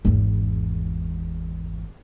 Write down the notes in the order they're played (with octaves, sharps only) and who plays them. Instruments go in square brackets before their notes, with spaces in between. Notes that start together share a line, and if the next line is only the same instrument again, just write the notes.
[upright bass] G#1 E2